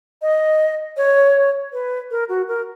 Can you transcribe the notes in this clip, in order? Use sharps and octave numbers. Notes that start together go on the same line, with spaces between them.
D#5
C#5
B4
A#4
F#4
A#4